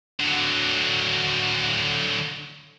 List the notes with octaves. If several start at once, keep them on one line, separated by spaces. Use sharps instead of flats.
D3 F#3